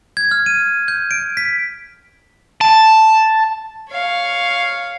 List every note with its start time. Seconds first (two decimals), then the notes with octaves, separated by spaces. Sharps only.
0.17 G#6
0.31 F6
0.46 D#7
0.88 G6
1.11 D7
1.37 B6
2.61 A5
3.90 C#5 F5